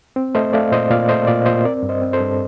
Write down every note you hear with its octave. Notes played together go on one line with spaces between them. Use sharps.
C4
A3 C5 D#5
A3 D5 F5
A#2 C5 D#5
A#2 D5 F5
A3 C5 D#5
A#2 D5 F5
A#2 C5 D#5
C4 A#4 D5
G2
C5 D#5
C4
A4 C5
G2